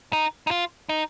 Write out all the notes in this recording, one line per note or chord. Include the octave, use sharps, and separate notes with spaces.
D#4
D#4
F4
D#4